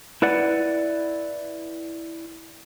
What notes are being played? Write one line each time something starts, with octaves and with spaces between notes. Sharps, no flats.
E4 B4 D5 F#5